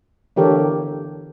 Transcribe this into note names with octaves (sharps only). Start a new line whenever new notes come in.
D3 E3 G4 A4 A#4 C#5